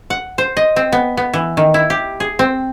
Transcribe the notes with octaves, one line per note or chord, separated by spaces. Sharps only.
F#5
C5
D#5
C4
B3
B3
E3
D#3
E4
G4
G#4
C4